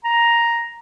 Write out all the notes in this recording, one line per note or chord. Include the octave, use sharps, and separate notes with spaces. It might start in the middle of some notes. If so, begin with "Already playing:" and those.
A#5